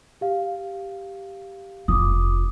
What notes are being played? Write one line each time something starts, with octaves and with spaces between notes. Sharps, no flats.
G4 F5
F1 F4 D6 D#6